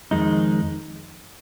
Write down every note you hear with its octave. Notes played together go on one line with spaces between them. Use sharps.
F2 D#3 G#3 D#4